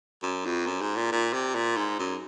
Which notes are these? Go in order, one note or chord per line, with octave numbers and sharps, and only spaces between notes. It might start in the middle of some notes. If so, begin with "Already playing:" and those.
F#2
F2
F#2
G#2
A#2
A#2
C3
A#2
G#2
F#2